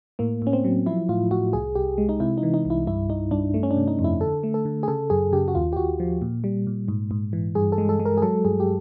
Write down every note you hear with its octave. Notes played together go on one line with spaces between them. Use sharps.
A2 A#3
A2 C#4
C4
F#3
F3 E4
A2 F4
A2 F#4
C2 G#4
C2 G4
G#3
D#4
C3 E4
D#4
E3
D#4
C2 E4
G2 E4
G2 D#4
G2 D4
A3
C#4
D4
C3
D#4
F2
E4
D3 A4
A3
A4
D3
G#4
C#3 A4
F#2 G#4
C#3 G4
F#4
D#2 F4
G4
D#2 F#4
F3
A#2
G3
A#2
G#2
G#2
E3
G2 G#4
A4
G#3
A4
G#3
A#4
G#4
F#3 A4
G2 G#4
G4